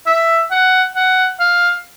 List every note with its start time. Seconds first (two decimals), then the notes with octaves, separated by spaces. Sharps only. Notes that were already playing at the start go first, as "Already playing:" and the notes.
0.06 E5
0.51 F#5
0.96 F#5
1.40 F5